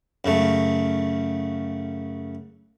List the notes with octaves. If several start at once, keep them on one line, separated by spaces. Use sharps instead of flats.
F#2 C#3 A3